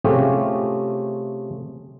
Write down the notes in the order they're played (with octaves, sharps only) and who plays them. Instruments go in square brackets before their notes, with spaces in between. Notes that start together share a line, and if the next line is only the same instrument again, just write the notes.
[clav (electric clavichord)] C3 A3 C#4 F4 G4 G#4